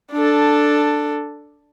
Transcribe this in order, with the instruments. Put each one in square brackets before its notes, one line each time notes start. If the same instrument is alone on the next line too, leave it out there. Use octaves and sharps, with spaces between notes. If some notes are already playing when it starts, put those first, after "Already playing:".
[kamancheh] D4 A4